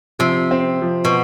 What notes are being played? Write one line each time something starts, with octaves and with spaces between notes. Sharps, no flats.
C3 F3
C4
F3
B2